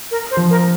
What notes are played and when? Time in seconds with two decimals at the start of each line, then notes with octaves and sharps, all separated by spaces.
0.11 A#4
0.31 C5
0.37 F3
0.50 A#4